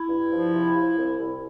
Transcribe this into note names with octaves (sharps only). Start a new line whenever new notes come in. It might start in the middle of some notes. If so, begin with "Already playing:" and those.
Already playing: E4
G2
F3
C3
F3
C2
C2